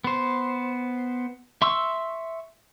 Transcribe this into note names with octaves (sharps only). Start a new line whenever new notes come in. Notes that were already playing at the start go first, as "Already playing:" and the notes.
B3 C5
E5 C6 C#6 E6